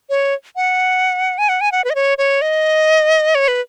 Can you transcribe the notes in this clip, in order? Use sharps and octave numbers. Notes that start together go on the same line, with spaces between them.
C#5
F#5
G#5
F#5
G#5
F#5
B4
D#5
C#5
C#5
D#5
C#5
B4